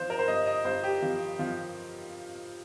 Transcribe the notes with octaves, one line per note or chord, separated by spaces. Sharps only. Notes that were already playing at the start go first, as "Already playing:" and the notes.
Already playing: F3 C5
A#4
C5
G2 D#5
D#5
G2 C5
G4
F3
F3